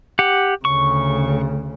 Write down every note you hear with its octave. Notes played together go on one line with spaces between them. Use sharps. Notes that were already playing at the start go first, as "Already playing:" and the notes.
G4 F#5
D2 C#3 C#6